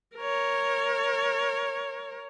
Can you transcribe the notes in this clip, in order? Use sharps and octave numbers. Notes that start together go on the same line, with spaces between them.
A#4 C#5